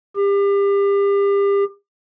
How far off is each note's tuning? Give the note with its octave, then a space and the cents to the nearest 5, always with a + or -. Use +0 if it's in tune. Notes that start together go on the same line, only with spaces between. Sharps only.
G4 +35